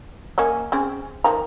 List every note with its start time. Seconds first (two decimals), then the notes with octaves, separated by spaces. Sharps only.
0.38 A#3 C#4 D#5
0.72 C4 C#4 G#4
1.24 D#3 F3 A#5